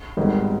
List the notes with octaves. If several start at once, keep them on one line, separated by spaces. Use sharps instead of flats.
G#1 G#2 D#3 G3 B3